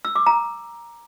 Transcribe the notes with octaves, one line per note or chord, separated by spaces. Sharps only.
E6
D6
A#5